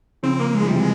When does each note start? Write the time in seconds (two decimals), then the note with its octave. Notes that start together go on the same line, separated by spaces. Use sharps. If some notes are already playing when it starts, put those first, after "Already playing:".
0.23 C#3 F3 C4
0.40 A#3
0.55 G#3
0.62 F3
0.67 C3 E3 G3
0.79 G#3